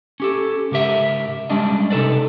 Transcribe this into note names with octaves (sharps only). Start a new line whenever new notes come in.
C#4 G4 A4
G#2 C#3 G4 A#4 E5
G3 G#3 C#4 D4 D5 D#5
C3 D#4 A4 B4 D5